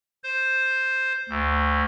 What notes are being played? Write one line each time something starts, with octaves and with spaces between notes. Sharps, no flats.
C5
D2